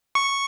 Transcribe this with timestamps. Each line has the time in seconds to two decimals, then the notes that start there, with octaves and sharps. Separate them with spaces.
0.15 C#6